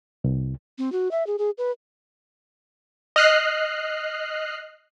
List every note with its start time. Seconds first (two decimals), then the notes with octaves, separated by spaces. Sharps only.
0.24 C2
0.78 C4
0.92 F#4
1.11 E5
1.27 G#4
1.38 G#4
1.58 B4
3.16 D#5 F6 F#6 C7